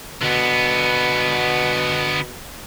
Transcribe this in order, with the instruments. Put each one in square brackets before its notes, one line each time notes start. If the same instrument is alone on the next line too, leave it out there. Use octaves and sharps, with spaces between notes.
[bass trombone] B2 [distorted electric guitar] D3 B3